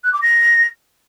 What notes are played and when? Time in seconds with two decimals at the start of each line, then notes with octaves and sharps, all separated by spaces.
0.04 F#6
0.13 D6
0.22 A#6